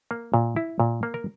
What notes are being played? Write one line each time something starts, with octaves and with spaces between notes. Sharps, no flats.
A#3
A#2
E4
A#2
A#3
A#4